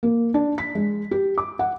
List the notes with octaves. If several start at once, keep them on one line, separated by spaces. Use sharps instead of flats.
A#3
D4
B6
G#3
G4
D6
F#5